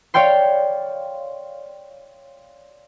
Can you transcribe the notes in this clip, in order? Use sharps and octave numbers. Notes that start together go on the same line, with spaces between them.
C#5 D5 F5 G5 C6